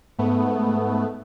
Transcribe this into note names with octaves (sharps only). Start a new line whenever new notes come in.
G#2 A3 B3